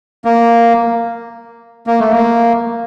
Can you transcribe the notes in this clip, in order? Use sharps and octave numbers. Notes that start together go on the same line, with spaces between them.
A#3
A#3
A3
A#3